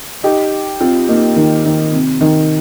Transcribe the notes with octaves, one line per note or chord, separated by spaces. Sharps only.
D#4 G4
C4 F4
A#3 D#4
D#3
D#3
C3
D#3